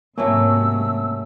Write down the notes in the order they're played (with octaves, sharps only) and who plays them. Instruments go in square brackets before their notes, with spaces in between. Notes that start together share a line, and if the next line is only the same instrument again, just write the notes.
[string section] G#2 C3 [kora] F#3 A3 C#4 [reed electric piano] A#3 [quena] E6